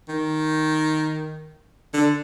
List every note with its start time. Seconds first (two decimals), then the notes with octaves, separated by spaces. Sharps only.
0.09 D#3
1.94 D3